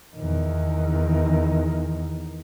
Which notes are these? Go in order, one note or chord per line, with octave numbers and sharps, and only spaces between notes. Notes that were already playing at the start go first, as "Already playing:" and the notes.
E2 D#3